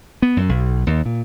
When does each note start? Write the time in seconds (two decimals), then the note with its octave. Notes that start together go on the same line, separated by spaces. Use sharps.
0.22 B3
0.37 F#2
0.49 B1
0.87 D#2
1.06 A#2